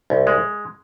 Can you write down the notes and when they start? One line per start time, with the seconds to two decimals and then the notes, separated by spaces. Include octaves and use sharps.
0.10 C2
0.27 G#3